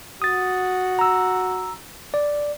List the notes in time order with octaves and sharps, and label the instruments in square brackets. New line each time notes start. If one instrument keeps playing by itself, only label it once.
[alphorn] F#4 [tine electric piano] D#6 A6
[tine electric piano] A#5 E6
D5